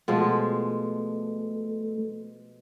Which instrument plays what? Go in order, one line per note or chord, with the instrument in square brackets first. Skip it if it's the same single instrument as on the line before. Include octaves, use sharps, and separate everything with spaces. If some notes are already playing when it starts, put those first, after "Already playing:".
[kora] B2 F3 G#3 [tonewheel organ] A3